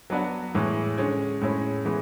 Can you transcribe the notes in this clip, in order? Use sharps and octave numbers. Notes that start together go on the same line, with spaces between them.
F#3 B3 D4 F#4
A2 E3 G#3
D3 G#3 C#4
A2 G#3 C#4 E4
E3 G#3 B3